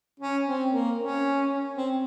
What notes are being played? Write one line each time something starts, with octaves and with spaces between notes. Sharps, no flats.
C#4
C4
A#3
C#4
C4